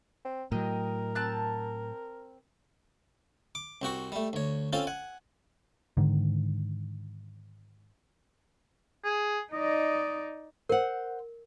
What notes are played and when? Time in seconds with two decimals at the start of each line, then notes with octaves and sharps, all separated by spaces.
0.25 C4
0.52 A2 F#3 A#4 D#5 G5
1.15 C4 A5 F#6
3.55 D6
3.82 C2 C4 F#4 C#6
4.12 G3 A3
4.33 D2 C#5
4.73 C4 C#4 F4 A4
4.87 F#5 G#5
5.97 G#2 D3 D#3
9.05 G#4
9.53 D#4 D5 D#5
10.69 A#4 C5 F#5